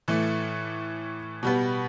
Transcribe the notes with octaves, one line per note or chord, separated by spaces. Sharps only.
A2 E3 A3
B2 G3 B3